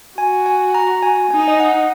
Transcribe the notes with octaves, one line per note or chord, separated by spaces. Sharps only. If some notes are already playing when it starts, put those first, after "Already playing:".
F#4 G#5
G#5
A#5
G#5
D#4 G#5
D#5
F#5